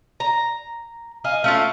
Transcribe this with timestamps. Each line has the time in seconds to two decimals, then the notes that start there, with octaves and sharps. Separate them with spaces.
0.20 A#5
1.24 D#5 F5 G#5
1.44 A3 C#4 F4